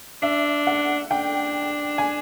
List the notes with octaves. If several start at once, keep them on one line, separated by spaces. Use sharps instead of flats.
D4 E5
F#5
D4 G5
G#5